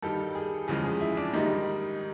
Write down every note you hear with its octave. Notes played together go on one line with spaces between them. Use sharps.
G2 D#3 G3 A4
G#4
E2 C#3 F3 G#3 G#4
G#4
E4
D4
G#2 D#3 G3 D#4